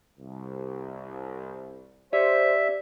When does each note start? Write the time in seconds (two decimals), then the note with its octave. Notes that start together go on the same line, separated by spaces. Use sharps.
0.18 C2
2.13 G4 C5 D5 E5